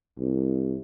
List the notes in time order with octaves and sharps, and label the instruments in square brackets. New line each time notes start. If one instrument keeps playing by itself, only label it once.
[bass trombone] C2